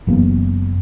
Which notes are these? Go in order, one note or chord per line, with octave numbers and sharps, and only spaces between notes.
F#1 E3 A#3 B3